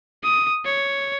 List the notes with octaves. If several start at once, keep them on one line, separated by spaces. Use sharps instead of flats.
D#6
C#5